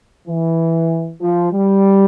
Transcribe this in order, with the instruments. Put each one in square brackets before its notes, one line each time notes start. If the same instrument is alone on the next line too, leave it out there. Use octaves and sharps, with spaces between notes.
[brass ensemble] E3
F3
G3